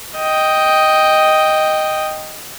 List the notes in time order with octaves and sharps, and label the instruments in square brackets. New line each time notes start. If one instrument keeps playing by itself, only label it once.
[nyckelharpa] D#5 G5